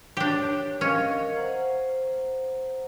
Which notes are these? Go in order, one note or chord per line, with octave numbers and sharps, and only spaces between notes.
D4 G4 C#5
C#4 A#4 D#5 F5
C5 F#5 A#5